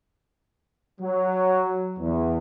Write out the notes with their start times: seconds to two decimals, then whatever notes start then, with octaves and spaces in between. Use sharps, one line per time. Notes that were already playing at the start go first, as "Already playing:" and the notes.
1.01 F#3
1.99 E2